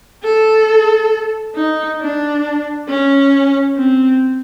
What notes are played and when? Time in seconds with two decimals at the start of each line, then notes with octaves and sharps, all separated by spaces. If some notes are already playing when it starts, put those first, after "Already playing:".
0.23 A4
1.55 D#4
2.00 D4
2.88 C#4
3.77 C4